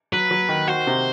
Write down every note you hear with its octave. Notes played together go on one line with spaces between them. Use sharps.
F#3 B4
F#3
D#3
F#4 C5
C3